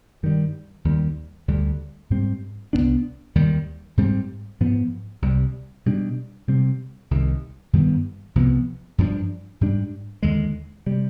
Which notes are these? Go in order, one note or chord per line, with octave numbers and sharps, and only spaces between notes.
G2 D#3 G3
D#2 D#3 G3
D2 D3 G3
G#2 G3 C4
C2 B2 B3 D4
D#2 D#3 G3
G#2 G3 C4
G#2 F3 B3
C2 C3 G3
B2 G3 D4
C3 G3 C4
C2 C3 D#3
G2 D#3 G3 B3
C2 C3 F3 B3
G2 F3 B3 D4
G#2 G3 D4
D#2 D3 G#3
C3 G3